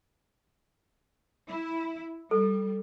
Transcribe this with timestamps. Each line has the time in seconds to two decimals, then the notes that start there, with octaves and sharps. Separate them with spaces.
1.48 E4
2.31 G3 A4